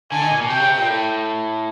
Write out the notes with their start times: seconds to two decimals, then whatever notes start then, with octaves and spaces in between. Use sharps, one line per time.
0.12 D3 G#5
0.21 D#3
0.31 A#2
0.41 B2
0.50 C3 G5
0.60 C#3
0.69 C3
0.78 A#2
0.88 A2